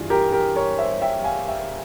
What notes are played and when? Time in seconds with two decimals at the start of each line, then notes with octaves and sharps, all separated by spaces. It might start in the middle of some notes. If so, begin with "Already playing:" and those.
Already playing: G2 E3 G3 F4 G#4
0.10 G4 A#4
0.33 G4 A#4
0.56 A#4 C#5
0.79 C5 E5
1.02 E5 G5
1.24 F5 G#5
1.48 E5 G5